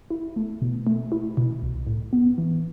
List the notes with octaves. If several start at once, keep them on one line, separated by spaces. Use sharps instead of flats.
E4
A3
B2
A3
E4
B2
C2
A2
B3
E3